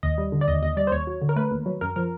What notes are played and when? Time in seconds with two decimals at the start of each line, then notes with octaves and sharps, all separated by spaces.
0.03 D#2 D#5
0.18 G3
0.32 D3
0.41 D5
0.48 D#2 D#5
0.62 D#2 D#5
0.77 G3 D5
0.87 C5
0.92 D#2 C#5
1.07 F#3
1.22 D3
1.29 A#4
1.36 A3 B4
1.51 D#2
1.66 F#3
1.81 F#2 A#4
1.96 F3 A#4